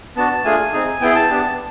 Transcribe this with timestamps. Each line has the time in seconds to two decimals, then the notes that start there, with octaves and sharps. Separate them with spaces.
0.16 B3 D4 F#4 A5
0.45 A3 D4 F4 G#4 G#5
0.73 C4 D#4 G#4
1.01 B3 E4 G#4 G5
1.15 A5
1.30 B3 D4 G4